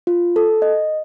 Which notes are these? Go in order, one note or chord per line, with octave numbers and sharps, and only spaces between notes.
F4
A4
D#5